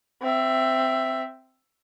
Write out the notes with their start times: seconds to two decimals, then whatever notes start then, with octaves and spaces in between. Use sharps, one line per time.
0.22 C4 E5